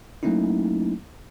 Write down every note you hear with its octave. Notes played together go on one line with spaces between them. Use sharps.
F#3 A3 A#3 C#4 D#4 E4